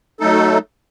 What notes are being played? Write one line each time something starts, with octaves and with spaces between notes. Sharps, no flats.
F#3 A3 D#4 A4